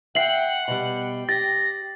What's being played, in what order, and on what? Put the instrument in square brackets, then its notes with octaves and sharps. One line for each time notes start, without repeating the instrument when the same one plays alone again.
[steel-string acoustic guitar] E5 [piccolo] F#5 [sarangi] G5 [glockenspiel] C7 F#7
[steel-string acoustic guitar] B2 G3 [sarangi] G5
[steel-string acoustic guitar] G4 [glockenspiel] A6 [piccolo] A#6